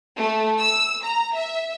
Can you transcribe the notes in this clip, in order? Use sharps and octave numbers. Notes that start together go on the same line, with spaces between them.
A3
E6
A#5
E5